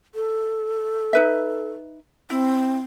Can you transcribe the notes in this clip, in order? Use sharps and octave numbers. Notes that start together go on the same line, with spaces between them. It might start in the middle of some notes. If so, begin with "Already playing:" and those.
A4
D#4 B4 E5
C4 E4